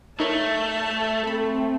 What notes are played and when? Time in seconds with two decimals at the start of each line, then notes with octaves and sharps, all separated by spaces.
0.20 A3 D#4 A#4 C#5 A5
1.23 A3 C4 A4 B5